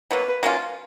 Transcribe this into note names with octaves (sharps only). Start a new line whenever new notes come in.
B2 F#3 A#3 B4
F#3 A#3 C#4 F4